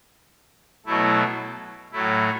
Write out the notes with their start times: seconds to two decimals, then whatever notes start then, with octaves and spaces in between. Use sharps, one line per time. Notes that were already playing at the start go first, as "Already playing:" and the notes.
0.86 B2 F#3 A3 E4
1.92 A2 F#3 A3 E4